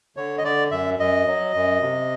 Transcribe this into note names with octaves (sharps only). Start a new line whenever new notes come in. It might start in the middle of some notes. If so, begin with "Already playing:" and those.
D3 C#5
D#5
D3 D5
F#2 E5
F#2 D#5
F#3
F#2
C3